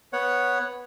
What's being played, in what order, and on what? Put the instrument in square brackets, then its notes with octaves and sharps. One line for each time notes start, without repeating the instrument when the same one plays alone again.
[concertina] B3 C#5 F#5